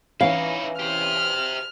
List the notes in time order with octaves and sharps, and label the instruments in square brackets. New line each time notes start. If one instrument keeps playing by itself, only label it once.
[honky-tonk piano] E3 C#4 [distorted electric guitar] D#4 E4 [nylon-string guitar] F5
[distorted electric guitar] G4 C5 [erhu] F6